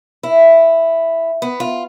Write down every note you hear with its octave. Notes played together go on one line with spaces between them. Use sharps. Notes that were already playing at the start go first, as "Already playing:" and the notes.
E4
B3
F4